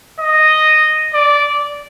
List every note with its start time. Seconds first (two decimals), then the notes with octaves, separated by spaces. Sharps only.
0.20 D#5
1.14 D5